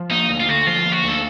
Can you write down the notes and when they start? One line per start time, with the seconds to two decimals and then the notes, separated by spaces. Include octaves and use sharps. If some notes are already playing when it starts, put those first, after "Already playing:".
Already playing: F3
0.10 A#3 D#4
0.29 D2
0.40 F4
0.48 D3 F#4
0.67 F3 F4
0.86 A#3
0.92 F#4
1.04 D2 A4